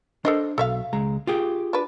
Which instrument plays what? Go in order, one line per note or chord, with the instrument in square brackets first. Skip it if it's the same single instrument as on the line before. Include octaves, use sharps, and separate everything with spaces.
[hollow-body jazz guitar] D4 C5 [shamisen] A4 A#4 D#5
[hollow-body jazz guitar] B1 [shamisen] A4 E5 F5
[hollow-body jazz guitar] C#2 G#3 A#5
F4 G4 G#4
[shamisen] D4 B4